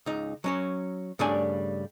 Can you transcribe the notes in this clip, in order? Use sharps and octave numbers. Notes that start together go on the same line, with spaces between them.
C#2 D#4
F#3 C#4 C#5
G2 C#3 G3 A3 D4 G#5